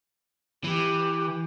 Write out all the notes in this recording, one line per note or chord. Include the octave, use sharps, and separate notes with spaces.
E3 G4